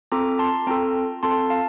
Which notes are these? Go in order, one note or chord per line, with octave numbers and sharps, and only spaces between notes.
C4 F4 A4 A#5 D6
A5 C6
C4 F4 A4 G5 A#5
C4 F4 A4 A5 C6
F5 A5